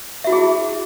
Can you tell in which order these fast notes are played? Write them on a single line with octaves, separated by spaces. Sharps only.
E5 F#4 E4 G#4